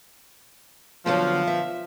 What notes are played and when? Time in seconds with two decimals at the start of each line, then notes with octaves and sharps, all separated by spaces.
1.06 D3 F3 F#3 B3
1.47 E5